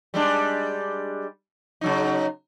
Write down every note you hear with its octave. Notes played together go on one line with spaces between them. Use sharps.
G3 G#3 D4
C#3 F#3 D#4